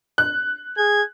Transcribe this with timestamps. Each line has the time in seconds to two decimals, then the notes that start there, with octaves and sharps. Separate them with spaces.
0.18 F#6
0.78 G#4 G#6